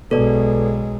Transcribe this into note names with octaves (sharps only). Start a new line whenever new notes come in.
B1 B2 G#3 A4 D5